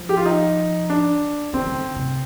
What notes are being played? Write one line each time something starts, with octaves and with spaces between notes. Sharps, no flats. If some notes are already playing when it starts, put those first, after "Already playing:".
Already playing: F3
G4
F4
D#4
D4
D#3 C4
D#3
D3
C3